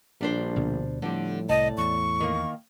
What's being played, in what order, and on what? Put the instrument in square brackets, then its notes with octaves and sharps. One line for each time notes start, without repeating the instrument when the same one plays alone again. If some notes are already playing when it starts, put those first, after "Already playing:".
[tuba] A#1 [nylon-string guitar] G3 D4 C5
[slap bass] D2 B2 D3
[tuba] A2 [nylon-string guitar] D3 C4 G4 [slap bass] F3 G3
[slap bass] C2 [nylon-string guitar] D5 A5 [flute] D#5
[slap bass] E2 [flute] C#6
[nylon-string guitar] D#3 A#3